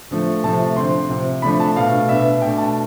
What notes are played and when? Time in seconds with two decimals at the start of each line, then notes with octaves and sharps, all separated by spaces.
0.11 D3 F3 A3
0.43 C3 F3 A3 A5
0.76 D3 F3 C4 C6
1.09 C3 F3 C4
1.42 D3 F3 A3 D4 B5
1.60 A5
1.76 B2 A3 D4 F5
2.08 B2 B3 D4 E5
2.42 B2 A3 D4 G5
2.58 A5